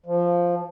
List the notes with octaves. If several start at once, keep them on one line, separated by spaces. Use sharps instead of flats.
F3